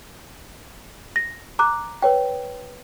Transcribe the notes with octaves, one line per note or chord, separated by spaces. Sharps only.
A#6
A#5 D6 F#6
B4 C#5 G5